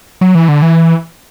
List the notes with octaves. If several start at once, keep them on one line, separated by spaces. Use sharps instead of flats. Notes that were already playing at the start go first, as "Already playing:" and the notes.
F#3
E3
D3
E3